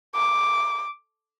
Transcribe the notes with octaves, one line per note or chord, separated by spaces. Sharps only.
D6